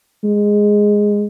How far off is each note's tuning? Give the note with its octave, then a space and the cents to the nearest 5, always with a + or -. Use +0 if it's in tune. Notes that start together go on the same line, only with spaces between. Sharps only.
G#3 -5